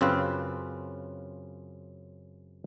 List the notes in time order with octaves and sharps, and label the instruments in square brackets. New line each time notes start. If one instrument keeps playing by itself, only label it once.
[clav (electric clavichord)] F#2 C#3 C4 C#4 F4 B4